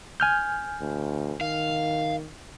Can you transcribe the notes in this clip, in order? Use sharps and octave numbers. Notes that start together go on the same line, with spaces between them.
G#5 F6 G6
D2
D#3 F5